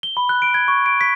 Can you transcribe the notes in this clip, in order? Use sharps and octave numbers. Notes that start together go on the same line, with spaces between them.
G7
B5
F#6
D7
G#6
C#6
D7
B6